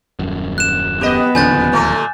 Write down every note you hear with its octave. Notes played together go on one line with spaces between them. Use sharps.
D#1 G#1 F#2
F#6 E7
B3 G4 D#5
D1 D#2 C#3 F3 G#5 G6 A6
A#2 A3 A#3